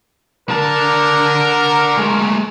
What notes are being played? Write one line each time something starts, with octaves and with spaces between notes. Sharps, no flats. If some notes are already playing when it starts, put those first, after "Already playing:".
D3 A#4 A5
G#3 A3